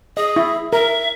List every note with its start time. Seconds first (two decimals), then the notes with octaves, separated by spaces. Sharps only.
0.17 G#4 D#5
0.36 E4
0.73 A#4 E5